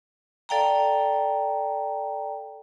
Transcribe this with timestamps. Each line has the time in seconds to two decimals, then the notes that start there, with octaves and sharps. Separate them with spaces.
0.49 A4 D5 F5 G5 A5 A#5